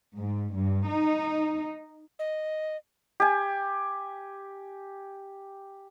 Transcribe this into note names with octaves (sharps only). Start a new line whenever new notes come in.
G#2
G2
D#4
D#5
G4 G#5